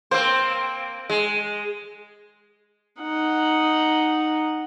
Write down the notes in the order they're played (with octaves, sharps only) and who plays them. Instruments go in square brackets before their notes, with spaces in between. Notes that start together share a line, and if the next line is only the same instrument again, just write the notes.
[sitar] A#3 C4 [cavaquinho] C5
[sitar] G#3
[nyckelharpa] D#4 F#5